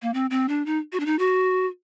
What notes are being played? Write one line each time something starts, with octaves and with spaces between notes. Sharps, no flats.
A#3
C4
C4
D4
D#4
F#4
D4
D#4
F#4